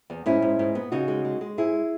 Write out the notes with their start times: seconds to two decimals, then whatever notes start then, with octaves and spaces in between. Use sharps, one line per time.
0.10 E2
0.26 G#2 C#4 E4
0.42 G#2
0.59 G#2
0.75 B3
0.92 C#3 D#4 F#4
1.08 G#3
1.25 G#3
1.41 G#3
1.58 G#2 E4 G#4